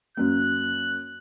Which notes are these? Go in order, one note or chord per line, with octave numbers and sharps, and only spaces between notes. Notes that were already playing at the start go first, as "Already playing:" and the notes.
F#2 A#3 F#6